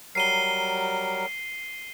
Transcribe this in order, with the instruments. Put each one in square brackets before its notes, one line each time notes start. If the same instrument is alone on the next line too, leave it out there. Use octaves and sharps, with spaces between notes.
[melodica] F#3 G3 A#4 [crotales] C7 D#7 G7